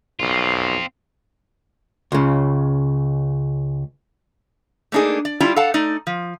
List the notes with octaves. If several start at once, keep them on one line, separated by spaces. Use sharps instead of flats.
B1 C4 F4
C#2 C#3
A3 A#3 D4 D#4 G#4
D5
G3 D4 E4 F4
A4 D5 F5 F#5 A5
A3 D#4 D5
F3